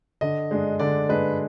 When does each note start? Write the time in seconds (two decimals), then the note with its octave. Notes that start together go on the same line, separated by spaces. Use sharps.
0.21 D3 D#5
0.51 G#3 D4
0.79 D3 D5
1.09 G#3 D4 B4